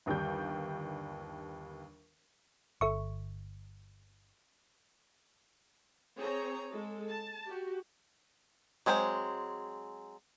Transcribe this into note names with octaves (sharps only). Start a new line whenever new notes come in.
G1 D#2 G3 G6
G1 A4 E5 C#6
C4 G#4 C#5 A#5
G#3 A4
A5
F#4 G4
F#3 G#3 C4 E4 C5